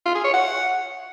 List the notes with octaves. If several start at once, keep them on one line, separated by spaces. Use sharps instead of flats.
F4
G#4
C#5
F#5